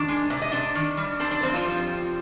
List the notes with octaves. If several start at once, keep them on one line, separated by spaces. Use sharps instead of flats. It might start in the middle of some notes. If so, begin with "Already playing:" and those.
Already playing: D#3 D4 D5
G#3
C3 D5
D#5
C3 D4 D5
D#3
G3
C4 D4 D5
D4 D5
F2 C4 C5
F3 F4
G3
C4